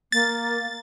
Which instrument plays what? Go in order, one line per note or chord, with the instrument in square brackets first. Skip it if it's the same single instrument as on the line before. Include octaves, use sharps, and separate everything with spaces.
[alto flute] A#3 [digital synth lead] A6